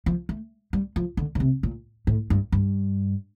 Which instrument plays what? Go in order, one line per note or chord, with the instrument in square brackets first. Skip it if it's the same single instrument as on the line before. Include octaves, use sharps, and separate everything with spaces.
[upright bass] F3
A3
G3
F3
D3
D3
C3
A#2
A2
G2
G2